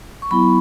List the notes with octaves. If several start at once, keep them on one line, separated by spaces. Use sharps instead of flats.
C#6
F#3 B3 E4 B5